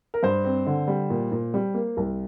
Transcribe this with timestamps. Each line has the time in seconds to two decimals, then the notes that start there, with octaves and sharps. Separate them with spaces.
0.14 A#4
0.23 G2 C5
0.45 C4
0.66 D3
0.88 G3
1.10 A#2
1.32 A#2
1.54 G3
1.74 A#3
1.97 C2